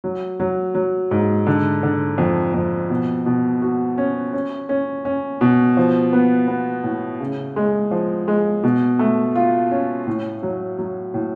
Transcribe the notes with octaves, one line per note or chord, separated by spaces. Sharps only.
F#3
F#3
F#3
G#2
D3
D3
F2
F2
B2
B2
F#4
C#4
C#4
C#4
C#4
B2
F3
B3
B3
A2
C#3
G#3
F3
G#3
B2
A3
F4
C#4
A2
F#3
F#3
A2